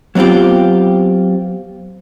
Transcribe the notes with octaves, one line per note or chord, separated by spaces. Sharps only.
F#3 B3 C4 F4 G4